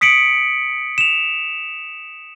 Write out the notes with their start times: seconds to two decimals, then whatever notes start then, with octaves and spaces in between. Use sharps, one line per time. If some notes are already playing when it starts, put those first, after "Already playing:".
0.01 D#6 B6 C#7 D7 F#7
0.98 E7 F7